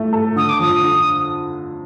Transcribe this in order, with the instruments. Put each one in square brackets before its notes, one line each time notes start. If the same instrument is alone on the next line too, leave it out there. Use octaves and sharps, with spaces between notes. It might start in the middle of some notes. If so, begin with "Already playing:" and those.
Already playing: [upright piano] A2 A3
A4
[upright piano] D3 [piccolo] D#6
[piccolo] D6
[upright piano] F2 [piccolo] D#6
[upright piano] D3